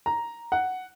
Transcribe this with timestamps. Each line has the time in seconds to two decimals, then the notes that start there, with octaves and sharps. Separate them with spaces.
0.06 A#5
0.52 F#5